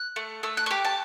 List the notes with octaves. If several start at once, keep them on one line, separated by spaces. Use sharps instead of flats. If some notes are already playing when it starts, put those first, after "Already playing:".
Already playing: F#6
A3
A3 E6
F#6
C#6
G4 D6
A5